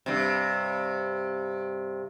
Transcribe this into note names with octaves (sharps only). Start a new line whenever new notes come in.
G2 C3